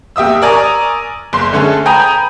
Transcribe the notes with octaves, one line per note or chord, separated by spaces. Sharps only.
D#2 G4 E5 D#6 E6
A#4 D5 G#5 A#5 C#6 D#6
F#1 C6
D3 A3 C#4 G#4 A4
G5 G#5 A#5 B5 D#6 G6